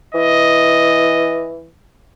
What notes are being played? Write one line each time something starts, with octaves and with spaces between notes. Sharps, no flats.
E3 D#5